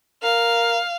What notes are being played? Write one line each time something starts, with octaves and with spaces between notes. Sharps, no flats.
A#4 F5